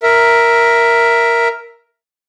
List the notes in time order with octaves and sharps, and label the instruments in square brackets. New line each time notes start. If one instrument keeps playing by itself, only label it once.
[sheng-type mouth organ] A#4 E5